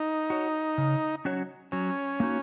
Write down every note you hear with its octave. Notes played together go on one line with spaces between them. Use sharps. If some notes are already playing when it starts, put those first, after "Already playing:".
Already playing: D#4
F#4 C#5
C#3
F#3 C#4 F#4 C#5
F#3 C#4
A#3 D#4 F#4